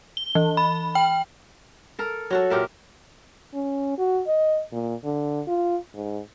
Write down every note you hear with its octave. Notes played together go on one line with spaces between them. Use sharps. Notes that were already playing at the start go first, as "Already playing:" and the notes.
G7
E3
B5
G5
A4 A#4
F#3 F#4 A4
A#2 G4 A#4 E5
C#4
F#4
D#5
A#2
D3
F4
G#2